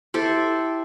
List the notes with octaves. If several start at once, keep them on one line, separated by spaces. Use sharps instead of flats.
E4 G4 A4 C5